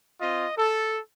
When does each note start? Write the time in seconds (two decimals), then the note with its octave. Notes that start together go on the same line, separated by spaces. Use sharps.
0.19 C4 F4 D#5
0.58 A4